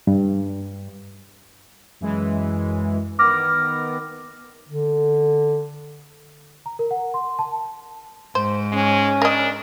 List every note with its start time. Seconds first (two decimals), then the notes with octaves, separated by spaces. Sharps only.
0.07 G2
2.01 F#2 E3 G#3
3.19 D#3 B3 D6 F6 A#6
4.69 D3
6.66 A#5
6.79 A#4
6.91 F#5
7.14 C6
7.39 A5
8.35 G#2 C5
8.72 G#3 C#4
9.22 D4 A#4 D#5